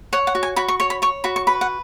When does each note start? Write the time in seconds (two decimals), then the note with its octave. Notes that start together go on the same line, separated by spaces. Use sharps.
0.13 C#5 F#5
0.27 F#5
0.35 F#4
0.43 G#5
0.56 F#4 B5
0.68 C#6
0.80 C#5 C#6
0.90 B5
1.02 C#5 C#6
1.24 F#4 B5
1.36 C#6
1.47 B4 B5
1.61 F#5